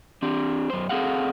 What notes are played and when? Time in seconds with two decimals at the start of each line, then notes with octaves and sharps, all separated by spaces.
0.22 C4 D4 G4
0.70 F#2 C5
0.89 C4 G#4 A4 F5 F#5